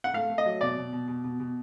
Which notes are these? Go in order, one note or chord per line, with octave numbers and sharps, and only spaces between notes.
F#5
A3 F5
A3
D#5
F#3
B2 D5
B2
B2
B2
B2
B2